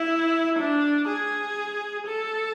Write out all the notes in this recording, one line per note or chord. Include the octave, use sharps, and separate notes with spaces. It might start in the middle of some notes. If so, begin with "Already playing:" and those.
Already playing: E4
D4
G#4
A4